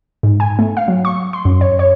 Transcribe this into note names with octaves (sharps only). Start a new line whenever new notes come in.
G#2
G#5
A3
F5
F#3
C#6
C6
F#2
C#5
C#5